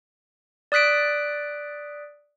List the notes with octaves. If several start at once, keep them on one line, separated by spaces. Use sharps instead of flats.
D5 D#6 F#6 B6 D7